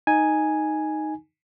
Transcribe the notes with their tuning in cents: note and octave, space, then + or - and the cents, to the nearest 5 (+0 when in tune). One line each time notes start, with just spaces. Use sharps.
D#4 +0 G#5 +0